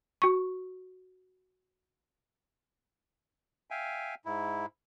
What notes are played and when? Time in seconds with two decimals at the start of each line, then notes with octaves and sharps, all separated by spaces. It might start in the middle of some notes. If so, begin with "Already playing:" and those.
0.22 F#4 C#6
3.71 E5 F5 G5 G#5
4.25 G#2 E4